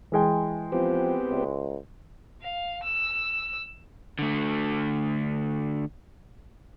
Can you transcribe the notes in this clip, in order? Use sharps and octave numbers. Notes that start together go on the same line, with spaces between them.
E3 G#3 G5
F3 B3 C4 G4
C#2
F5
E6
D3 A3